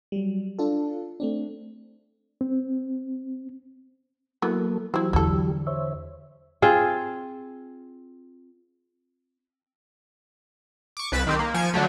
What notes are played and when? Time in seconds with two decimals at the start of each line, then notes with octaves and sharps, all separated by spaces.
0.12 F#3 G3
0.59 D4 F4 A4
1.20 A3 C4 D4
2.41 C4
4.42 E3 F#3 A#3 B3 A4
4.94 E3 F#3 C4 E4 G4
5.13 E2 D3 E4 A4
5.67 C5 C#5 E5
6.62 C4 F4 G#4
10.97 C#6 D6
11.12 C2 B4 B5 A6 E7
11.27 D#3 C4 G4
11.39 A#3
11.54 F3 G#5 C#7 D7 E7
11.74 D3 F#3 A3